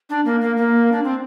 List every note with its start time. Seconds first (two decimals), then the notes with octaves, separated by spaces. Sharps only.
0.10 D4
0.25 A#3
0.41 A#3
0.57 A#3
0.92 D4
1.03 C4